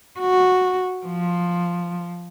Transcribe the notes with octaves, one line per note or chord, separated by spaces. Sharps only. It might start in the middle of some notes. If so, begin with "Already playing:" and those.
F#4
F3